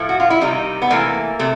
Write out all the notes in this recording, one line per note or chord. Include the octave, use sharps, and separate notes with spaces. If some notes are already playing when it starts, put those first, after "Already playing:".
Already playing: A2 F3 A3
F#4
F4
E4
C3 D#3 G3 D#4
B3
C3 E3 A3 A#3
C3 A3